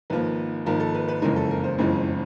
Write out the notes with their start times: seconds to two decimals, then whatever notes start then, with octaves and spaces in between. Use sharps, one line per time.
0.10 G#1 G#2 F3 A#3 B4
0.66 G#1 G#2 F3 A#3 A#4
0.80 A4
0.95 B4
1.08 B4
1.22 F#1 F2 C#3 E3 G#3 A#4
1.36 A4
1.51 A#4
1.64 C5
1.78 F#1 F2 C#3 E3 G#3